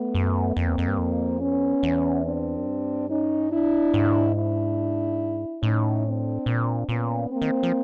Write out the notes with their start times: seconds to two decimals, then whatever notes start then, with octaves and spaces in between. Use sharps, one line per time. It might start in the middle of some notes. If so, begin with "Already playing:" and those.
Already playing: A3 B3
0.15 F#2
0.56 F2 A#3 C4
0.67 E2
0.78 F2
0.88 G2
0.98 F2
1.40 B3 C#4
1.83 E2
2.25 C4 D4
2.57 F#2
2.67 G2
3.09 C#4 D#4
3.51 D4 E4
3.94 G#2
4.35 D4 E4
5.62 A2 C#4 D#4
6.05 C4 D4
6.46 A#2
6.88 A#2 B3 C#4
7.30 A#3 C4
7.42 D#3
7.63 F3